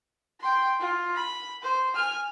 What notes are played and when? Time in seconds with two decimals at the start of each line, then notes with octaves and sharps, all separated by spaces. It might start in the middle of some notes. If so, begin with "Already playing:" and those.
0.40 G5 C6
0.80 F4
1.15 B5
1.62 C5
1.95 G#5 F6